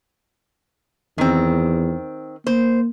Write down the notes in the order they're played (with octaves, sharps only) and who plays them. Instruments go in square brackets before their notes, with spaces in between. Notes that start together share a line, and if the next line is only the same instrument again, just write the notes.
[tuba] E2 [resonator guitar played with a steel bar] D#3 C4
[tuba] A#3 [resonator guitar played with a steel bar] C5